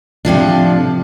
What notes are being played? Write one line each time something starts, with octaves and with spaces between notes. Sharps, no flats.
A2 C3 F3 D4